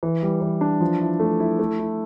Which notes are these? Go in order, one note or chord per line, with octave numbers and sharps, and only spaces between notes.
E3
G3
E3
D4
F3
E4
A3
E4
A3
E4